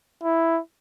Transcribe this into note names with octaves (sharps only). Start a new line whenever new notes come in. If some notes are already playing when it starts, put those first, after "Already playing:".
E4